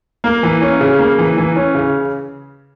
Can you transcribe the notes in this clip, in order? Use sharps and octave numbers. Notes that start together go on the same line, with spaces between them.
A#3
E3
C#4
C#3
A#3
E3
E3
C#4
C#3